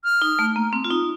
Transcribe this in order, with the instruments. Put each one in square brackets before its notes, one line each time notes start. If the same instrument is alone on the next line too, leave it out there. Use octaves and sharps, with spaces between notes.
[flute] F6
[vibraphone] D#4
A3
A#3
C4
F4
D#4